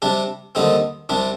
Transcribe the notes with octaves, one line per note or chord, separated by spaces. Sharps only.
C3 G3 D4
D#2 D3 G3 C4 D#4
C2 C3 G3 D4